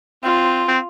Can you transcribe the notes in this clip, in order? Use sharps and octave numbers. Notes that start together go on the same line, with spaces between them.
C4 F4
C4